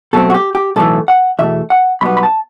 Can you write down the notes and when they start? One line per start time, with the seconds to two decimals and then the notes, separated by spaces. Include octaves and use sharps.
0.13 B2 F#3 A3 C4 A4
0.30 F#4
0.34 G4
0.55 G4
0.76 B1 A2 E3 A3 A4
1.08 F#5
1.39 E2 B2 A3 E5
1.70 F#5
2.01 B1 B2 G3 B3 B5
2.17 B5
2.23 A5